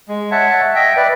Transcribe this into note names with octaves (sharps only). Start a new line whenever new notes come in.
G#3
C#5 E5 F#5 A5
D#5 E5 G5
B4 D5